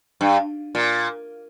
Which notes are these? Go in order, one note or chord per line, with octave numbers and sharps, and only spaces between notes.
G2
A#2